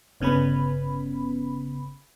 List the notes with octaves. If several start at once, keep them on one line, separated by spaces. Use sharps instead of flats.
G1 C#3 B3 C#4 B5